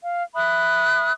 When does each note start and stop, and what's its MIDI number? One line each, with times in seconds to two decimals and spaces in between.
0.02 0.23 77
0.35 1.12 76
0.35 1.12 83
0.35 1.12 87
0.35 1.12 90